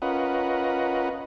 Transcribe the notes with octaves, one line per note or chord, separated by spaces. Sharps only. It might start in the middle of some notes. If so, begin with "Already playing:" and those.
C#4 F4 A#4 B4 D#5 F#5